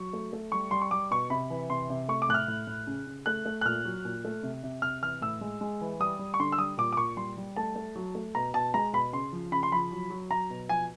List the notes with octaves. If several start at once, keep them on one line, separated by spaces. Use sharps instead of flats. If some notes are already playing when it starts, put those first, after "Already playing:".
Already playing: F#3 C#6
A3
A3
G3 C#6
G3 C6
C#6
G3 D6
B2 C#6
C3 B5
E3
C3 C6
C3
A3 C#6
D6
A2 F#6
F6
A2
A2
C#3
C#3
A3 F#6
A3
F#6
A#2 F6
F#3
A#2
A3
C3
C3
C3 F6
E3 F6
A2 E6
G#3
G#3
E3
G3 D#6
G3
C#6
D3 C6
E6
G3 D#6
A#2 D6
D6
A#2 C#6
G3 C6
G3
A3 A5
A3
F#3
A3
B2 A#5
B2 A5
G#3 A#5
B2 B5
C#3 C6
F3
C#3 B5
C6
F3 B5
F#3
F#3
F#3 A#5
B2
F3 G#5